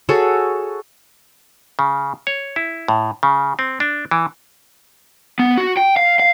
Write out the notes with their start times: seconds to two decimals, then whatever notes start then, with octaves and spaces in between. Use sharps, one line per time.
0.09 F#4 G#4 A4 C#5
1.79 C#3
2.27 C#5
2.56 E4
2.88 A2
3.23 C#3
3.59 C4
3.80 D4
4.11 E3
5.39 B3
5.58 F#4
5.77 G5
5.97 F5
6.20 F5